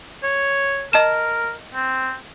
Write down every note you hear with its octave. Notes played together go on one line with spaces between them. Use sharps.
C#5
A#4 D#5 A5 E7
C4